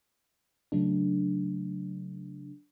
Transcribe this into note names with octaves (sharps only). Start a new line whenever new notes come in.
C#3 F#3 A3 D4